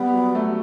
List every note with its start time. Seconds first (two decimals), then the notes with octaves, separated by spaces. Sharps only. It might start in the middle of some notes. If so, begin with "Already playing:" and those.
Already playing: G3 B3
0.14 F#3
0.35 F#3 A3